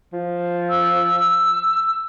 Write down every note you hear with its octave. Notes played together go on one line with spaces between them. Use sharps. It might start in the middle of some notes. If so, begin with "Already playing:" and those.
F3
E6